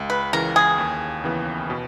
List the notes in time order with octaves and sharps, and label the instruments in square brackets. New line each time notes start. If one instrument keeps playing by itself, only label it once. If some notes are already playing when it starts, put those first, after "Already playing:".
Already playing: [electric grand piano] C#2
[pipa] B4
[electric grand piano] C#3 E3 [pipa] A#4
[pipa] G#4
[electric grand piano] D#2
C#3 E3 B3
B2